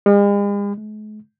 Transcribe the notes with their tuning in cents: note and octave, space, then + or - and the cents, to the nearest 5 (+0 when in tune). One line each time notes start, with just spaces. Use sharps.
G#3 -45
G#3 +45